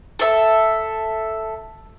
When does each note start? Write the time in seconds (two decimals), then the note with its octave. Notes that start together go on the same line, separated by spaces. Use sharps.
0.19 A4 E5